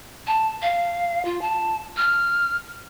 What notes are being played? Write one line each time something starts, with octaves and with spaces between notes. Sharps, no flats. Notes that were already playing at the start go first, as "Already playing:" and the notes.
A5
F5
F4
A5
F6